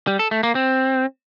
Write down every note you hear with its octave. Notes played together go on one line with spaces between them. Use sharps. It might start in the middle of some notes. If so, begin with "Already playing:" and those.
G3
A4
A3
A#3
C4